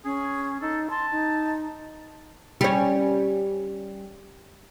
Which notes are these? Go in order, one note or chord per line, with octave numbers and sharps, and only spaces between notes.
C#4 G#4
D#4 A4
A5 C6
D#4
G3 C#4